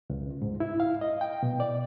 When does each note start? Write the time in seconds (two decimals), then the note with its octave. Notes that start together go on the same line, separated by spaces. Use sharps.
0.10 C#2
0.42 G#2
0.60 E4
0.80 F5
1.01 D#5
1.21 G5
1.43 B2
1.60 D5